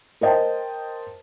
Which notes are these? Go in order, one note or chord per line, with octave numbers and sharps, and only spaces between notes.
A#4 C5 D#5 G5 A5